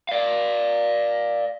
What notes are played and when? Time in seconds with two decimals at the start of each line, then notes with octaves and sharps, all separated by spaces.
0.09 D5 F5